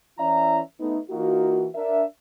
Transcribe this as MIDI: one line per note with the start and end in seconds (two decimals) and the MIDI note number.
0.19 0.59 52
0.19 0.59 61
0.19 0.59 64
0.19 0.59 74
0.19 0.59 76
0.19 0.59 82
0.80 0.99 57
0.80 0.99 59
0.80 0.99 63
1.10 1.66 52
1.10 1.66 58
1.10 1.66 63
1.10 1.66 65
1.10 1.66 66
1.75 2.04 62
1.75 2.04 70
1.75 2.04 76